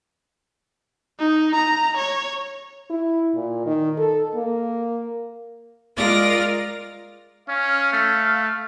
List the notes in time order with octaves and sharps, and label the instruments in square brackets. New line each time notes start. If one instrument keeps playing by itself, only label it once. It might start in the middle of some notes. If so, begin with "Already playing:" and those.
[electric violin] D#4
A#5
C#5
[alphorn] E4
A#2
D#3
A4
A#3
[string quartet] G#3 F4 A#4 D5 A6 A#6
[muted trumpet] C#4 [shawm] F5
[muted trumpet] A3